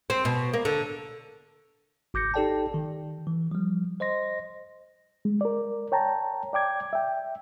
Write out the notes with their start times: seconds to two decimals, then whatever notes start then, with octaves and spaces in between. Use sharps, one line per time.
0.10 C4
0.25 B2
0.53 A#3
0.65 D3
2.14 G#1 D6 G6 A#6 C#7
2.34 D#4 G4 A4 D5 G5 A5
2.74 D#3
3.27 E3
3.51 F3 G3
4.00 C5 D#5 C6 A#6
5.25 G#3
5.41 A#4 D5
5.92 C#5 G5 A5 A#5
6.53 D5 G5 D6 G#6
6.93 E5 G5